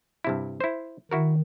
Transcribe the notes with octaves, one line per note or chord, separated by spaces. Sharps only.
G2 C3 E4
E4 C5
D#3 E4 F#4 A#4